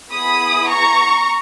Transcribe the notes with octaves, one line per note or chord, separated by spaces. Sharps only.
B3 E4 G#4 B5 D#6
A#5 C#6